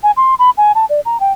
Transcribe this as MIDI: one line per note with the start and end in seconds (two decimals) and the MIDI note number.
0.03 0.11 80
0.17 0.34 84
0.39 0.50 83
0.57 0.72 80
0.75 0.85 81
0.89 1.00 74
1.05 1.20 82
1.20 1.33 79